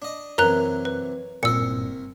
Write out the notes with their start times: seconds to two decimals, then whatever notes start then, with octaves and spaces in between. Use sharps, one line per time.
0.02 D4 D#5
0.38 F#2 C3 E3 F#3 A#4 A#5 F#6
0.85 B4
1.43 F#1 C2 G2 A#2 A#4 E6 C#7